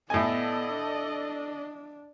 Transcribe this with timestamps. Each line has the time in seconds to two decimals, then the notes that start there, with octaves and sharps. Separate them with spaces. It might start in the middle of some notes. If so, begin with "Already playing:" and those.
0.10 A2 B3 A4 D5 D#5 G#5 A5
0.71 D4